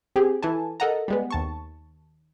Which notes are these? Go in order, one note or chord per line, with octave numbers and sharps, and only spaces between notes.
C4 G4 G#4
E3 A4 G#5 A5
A4 A#4 D#5 F#5 A5 A#5
G3 G#3 B3
D#2 A5 C#6